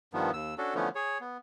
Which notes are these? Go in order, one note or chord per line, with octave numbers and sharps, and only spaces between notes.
G2 D#3 F3 B3
D#2 E6
C#4 D4 F#4 A4
D3 E3 F3 A3 B3 C#4
G#4 C#5
B3